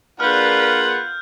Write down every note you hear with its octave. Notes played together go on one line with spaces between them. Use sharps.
A#3 D4 F4 G#4 B4 F#5 F6 G6